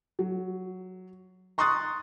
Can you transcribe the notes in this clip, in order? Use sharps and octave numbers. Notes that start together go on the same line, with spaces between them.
F#3
A#5 C6 C#6 D#6 F#6 A6